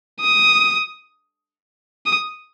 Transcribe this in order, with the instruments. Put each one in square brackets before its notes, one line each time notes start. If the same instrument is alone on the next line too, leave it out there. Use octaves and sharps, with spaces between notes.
[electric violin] D#6
D#6